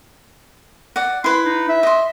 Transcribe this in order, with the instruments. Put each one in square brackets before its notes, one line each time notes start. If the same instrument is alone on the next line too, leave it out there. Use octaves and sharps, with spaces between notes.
[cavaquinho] D5 F#5
[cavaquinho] E4 B4 [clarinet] C6
[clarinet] D#4
E5
[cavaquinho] D#5 C6